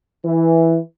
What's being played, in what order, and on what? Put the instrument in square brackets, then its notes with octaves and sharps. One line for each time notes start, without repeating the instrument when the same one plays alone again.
[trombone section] E3